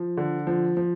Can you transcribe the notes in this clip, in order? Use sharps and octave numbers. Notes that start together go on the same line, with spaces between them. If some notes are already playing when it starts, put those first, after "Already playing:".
Already playing: F3
D3
F3
F3